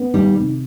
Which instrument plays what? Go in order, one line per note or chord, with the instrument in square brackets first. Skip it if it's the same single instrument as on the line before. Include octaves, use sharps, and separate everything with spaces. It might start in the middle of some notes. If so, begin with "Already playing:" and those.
Already playing: [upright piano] B3
[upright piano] D#3 [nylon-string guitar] G3
[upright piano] C3